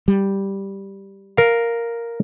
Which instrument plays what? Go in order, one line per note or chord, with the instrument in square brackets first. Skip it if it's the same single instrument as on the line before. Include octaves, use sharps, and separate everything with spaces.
[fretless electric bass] G3
[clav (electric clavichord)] A#4 F5